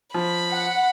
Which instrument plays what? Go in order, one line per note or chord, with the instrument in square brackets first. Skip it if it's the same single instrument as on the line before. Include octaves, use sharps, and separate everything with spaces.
[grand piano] F3 [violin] B5
[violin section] F#5